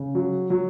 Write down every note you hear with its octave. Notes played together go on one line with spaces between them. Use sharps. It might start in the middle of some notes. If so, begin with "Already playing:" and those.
Already playing: C#3
F#3
F#3